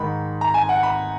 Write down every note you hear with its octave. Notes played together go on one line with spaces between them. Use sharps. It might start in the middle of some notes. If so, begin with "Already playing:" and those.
Already playing: G#2 D#3 G#3 D#4 B5
A#5
G#5
F#5
B5